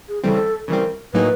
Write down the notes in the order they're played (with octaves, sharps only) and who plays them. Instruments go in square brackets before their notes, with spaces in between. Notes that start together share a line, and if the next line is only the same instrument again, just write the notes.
[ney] G#4
[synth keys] C#3 E3 G3 C4 [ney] A4
[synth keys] C#3 E3 G3 C4 [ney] A#4
[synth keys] A2 F#3 A#3 D#4 G#4 [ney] B4